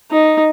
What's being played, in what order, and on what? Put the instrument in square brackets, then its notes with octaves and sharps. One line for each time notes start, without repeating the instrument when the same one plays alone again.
[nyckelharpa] D#4